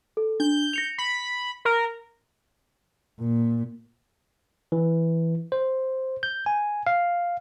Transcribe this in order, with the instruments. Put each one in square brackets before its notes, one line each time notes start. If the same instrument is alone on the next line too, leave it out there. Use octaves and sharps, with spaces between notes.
[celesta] A4
[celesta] D4 [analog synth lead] G6
[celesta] A#6 C#7 F7
[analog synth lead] B5
A#4
[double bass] A#2
[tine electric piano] E3
C5
G6
G#5
F5